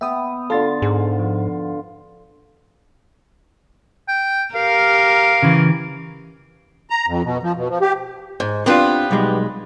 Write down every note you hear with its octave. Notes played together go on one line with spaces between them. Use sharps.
B3 E5 G5 D#6
D3 F4 A4 A6
G#2 G#4
F3
G5
G4 A#4 F5
C#3 E3
A#5
F2
B2
F3
B2
F3
G4
G#2
B3 C4 D4 F4 G4 B4
B1 G3 G#3